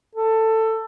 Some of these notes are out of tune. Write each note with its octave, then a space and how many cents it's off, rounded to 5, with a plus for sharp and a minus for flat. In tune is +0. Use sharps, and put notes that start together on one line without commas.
A4 +15